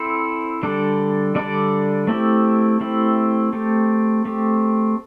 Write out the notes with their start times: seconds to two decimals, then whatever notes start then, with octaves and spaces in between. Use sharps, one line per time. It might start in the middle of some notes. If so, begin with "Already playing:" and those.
Already playing: C4 E4 A4 C5
0.63 D3 G3 D4 A4 D5
1.35 D3 G3 D4 A4 D5
2.07 A3 C4 E4 G4
2.81 A3 C4 E4 G4
3.53 A3 C4 G4
4.25 A3 C4 G4